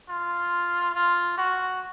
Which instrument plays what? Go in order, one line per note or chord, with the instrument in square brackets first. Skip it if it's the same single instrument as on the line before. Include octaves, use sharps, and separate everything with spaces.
[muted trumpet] F4
F4
F#4